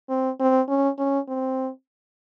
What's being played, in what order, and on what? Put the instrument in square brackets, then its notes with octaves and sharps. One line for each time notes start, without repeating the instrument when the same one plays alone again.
[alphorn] C4
C4
C#4
C#4
C4